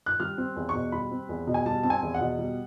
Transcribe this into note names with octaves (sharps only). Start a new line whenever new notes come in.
F#6
G3 F6
C4
E2
C#6
B2
G3 B5
C4
E2
B2
G#5
G3 A5
C4 A5
G#5
E2
F#5
B2
G3